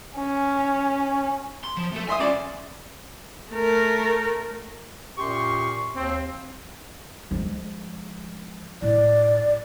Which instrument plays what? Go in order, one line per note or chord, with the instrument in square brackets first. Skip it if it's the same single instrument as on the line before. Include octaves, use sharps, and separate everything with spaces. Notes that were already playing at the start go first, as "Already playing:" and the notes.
[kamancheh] C#4
[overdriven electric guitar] C6
F3
A3 A4
[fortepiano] E5 C6 D#6 [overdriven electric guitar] G#5
[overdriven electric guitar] C#4 F4 [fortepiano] D5
[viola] A3 A#4
[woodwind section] F#2 A#2 G4 C6 C#6
D#2 C4
[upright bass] F3 G#3
[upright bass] A2 [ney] D5